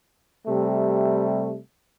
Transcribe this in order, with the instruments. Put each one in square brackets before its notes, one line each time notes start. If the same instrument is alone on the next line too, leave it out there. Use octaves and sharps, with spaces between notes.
[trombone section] C3 G3 A3